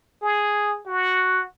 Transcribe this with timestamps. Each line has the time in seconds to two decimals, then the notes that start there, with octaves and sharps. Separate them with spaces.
0.22 G#4
0.86 F#4